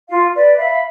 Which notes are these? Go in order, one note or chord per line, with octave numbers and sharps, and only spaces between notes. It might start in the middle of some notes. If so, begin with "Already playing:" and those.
F4 F5
B4 D5
E5 F5 B5